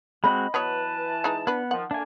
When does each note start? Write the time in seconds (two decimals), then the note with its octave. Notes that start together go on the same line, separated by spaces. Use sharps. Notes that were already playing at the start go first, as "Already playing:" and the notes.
0.24 G#3 C4 F#4 D#5 B5
0.54 E3 F#3 B3 B4 C#5 A5
1.24 G#3 D#4
1.47 B3 D4 B4
1.71 D#3 F3 F#5
1.91 A3 A#3 D4 G#5